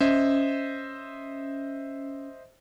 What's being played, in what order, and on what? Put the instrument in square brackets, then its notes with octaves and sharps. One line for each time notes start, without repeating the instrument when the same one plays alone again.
[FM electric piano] C#4 [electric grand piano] C5 D#5 E5